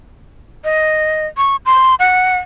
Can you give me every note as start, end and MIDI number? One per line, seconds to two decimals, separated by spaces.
0.64 1.27 75
1.37 1.56 85
1.66 1.95 84
2.00 2.38 78